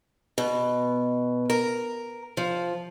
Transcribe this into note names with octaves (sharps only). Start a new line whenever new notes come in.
B2
A#4
F3